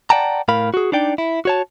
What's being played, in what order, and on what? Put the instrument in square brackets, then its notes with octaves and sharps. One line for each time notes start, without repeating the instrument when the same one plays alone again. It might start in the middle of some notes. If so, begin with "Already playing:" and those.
[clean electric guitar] D5 F#5 G5 A5 A#5
A2 A#4 F5 B5
F#4 G#4
D4 D#4 D5 G5
E4
F#4 C#5 A5